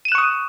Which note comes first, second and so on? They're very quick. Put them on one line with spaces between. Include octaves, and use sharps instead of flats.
D#7 E7 F#6 C#6 D#6